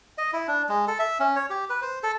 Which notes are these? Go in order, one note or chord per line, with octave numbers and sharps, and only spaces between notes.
D#5
E4
D4
G#3
A4
E5
C#4
C#5
G4
B4
C5
A4